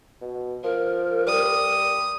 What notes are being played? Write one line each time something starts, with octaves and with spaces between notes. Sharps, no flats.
B2
F3 A#4
G3 D#6